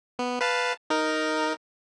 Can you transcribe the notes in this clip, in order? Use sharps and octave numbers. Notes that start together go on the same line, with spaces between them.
B3
B4 F5 A5
D#4 A#4